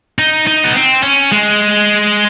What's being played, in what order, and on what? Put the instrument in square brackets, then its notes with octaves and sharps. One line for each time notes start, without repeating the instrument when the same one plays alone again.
[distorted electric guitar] D#4
D#4
B3
C4
C#4
G#3